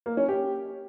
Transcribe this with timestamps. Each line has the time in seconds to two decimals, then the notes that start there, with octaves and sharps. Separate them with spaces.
0.06 A#3
0.17 C#4
0.28 G4